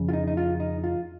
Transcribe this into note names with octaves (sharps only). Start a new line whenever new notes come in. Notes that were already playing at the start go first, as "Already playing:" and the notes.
Already playing: F2 C#3
F4
D#4
D#4
F4
D#4
F4